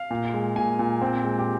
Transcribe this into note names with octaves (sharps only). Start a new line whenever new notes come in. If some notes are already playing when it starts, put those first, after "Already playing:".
Already playing: F5
A#2
G#3
A#2 G#5
A#2
C4 G5
G#3
G4